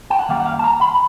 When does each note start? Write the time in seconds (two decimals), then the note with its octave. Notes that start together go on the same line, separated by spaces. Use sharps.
0.10 G5
0.19 F#5
0.29 F#2 D#3 G3 A#3 F5
0.40 F#5
0.46 F5
0.59 A5
0.64 A#5
0.81 B5